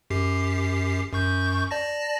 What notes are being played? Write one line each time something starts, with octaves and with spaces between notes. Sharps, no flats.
F#2 G4 C7
F#2 C#6 G6
D5 A5 A#6